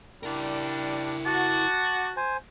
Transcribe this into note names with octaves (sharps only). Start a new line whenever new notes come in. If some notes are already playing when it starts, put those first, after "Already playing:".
G3 D4 E4 A#4
F#4 A5 D6
C5 G#5